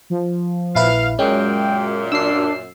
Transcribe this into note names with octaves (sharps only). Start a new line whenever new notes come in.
F3
A#1 E4 B4 F5
F#2 A#2 G#3 C#4 G5
D4 E6 C7